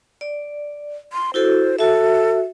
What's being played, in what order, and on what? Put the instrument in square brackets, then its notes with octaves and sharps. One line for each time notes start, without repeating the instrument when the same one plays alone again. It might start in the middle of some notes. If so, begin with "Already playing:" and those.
[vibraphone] D5
[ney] C6
[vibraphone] E4 F#4 A4 [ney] C5
[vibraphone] F#4 E5 [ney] A4